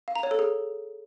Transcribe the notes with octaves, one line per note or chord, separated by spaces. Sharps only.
F5
A#5
C#5
A4
G#4